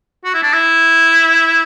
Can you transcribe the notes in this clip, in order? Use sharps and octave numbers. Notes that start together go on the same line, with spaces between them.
F#4
E4
D4
E4